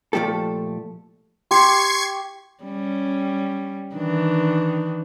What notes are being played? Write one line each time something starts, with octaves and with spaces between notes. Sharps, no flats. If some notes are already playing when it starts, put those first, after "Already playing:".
A#2 F3 A3 G4 A4
G4 C6 C#6 G#6 C7
G3 C#4
D#3 E3 D4